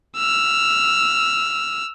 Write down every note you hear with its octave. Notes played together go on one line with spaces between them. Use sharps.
E6 F6